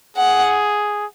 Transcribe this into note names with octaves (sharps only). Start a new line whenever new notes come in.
G#4 F#5